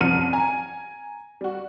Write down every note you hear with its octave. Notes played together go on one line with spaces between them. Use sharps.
C2 F#2 F3 F6 C#7 D#7
G#5 A#5
G3 F#4